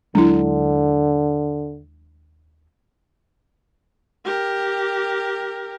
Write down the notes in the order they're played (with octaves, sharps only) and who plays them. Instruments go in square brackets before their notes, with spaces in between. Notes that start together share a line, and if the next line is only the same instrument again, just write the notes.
[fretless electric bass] D#2 F#3 G#3 [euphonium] D3 [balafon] D4 E4
[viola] G4 A#4